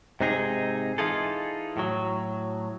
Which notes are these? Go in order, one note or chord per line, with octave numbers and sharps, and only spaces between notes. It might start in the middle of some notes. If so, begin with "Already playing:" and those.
G#2 C3 D#4 G#4
E3 D#4 F4 G#4 A4
A2 F#3